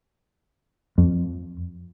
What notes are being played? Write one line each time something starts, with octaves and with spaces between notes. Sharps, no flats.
F2